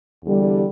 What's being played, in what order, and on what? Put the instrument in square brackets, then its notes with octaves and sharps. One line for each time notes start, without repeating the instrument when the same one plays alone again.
[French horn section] E2 D3 G3